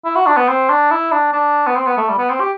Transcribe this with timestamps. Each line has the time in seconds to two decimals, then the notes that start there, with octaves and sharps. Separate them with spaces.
0.05 E4
0.16 F#4
0.26 D4
0.37 B3
0.48 C4
0.70 D4
0.91 E4
1.12 D4
1.33 D4
1.67 B3
1.76 C4
1.87 B3
1.98 A3
2.09 G3
2.18 B3
2.30 C4
2.40 G4